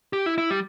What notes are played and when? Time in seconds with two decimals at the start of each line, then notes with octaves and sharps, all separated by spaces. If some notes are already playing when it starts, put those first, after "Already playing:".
0.13 G4
0.26 E4
0.38 E4
0.50 G3